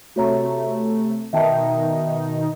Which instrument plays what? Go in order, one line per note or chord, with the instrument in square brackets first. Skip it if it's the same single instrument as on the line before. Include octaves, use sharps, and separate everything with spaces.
[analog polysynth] C3 A3 [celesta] F#4 C#5 A#5
[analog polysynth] B2 D#3 D#4 [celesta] E5 G5 A5